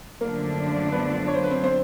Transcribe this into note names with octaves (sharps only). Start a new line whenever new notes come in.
F#2 D3 F3 A3 A#3 D4 A#4
B3 B4
C#5
C5
B4
C4 C5
C4 C5